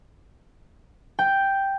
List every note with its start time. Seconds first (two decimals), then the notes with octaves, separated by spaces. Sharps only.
1.19 G5